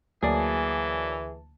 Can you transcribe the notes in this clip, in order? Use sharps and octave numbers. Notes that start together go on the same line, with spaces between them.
D2 E3 F#3 A#3 G#4 D5 A5